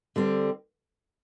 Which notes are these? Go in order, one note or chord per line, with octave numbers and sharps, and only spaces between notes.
D3 G3 C4